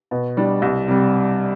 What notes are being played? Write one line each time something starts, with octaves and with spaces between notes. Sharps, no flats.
B2
G3 D4
C2
C3 G3